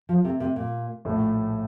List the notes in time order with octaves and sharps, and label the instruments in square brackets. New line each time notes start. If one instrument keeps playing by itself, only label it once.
[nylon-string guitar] F3
C3
C3
A#2
[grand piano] A#1 A2 A3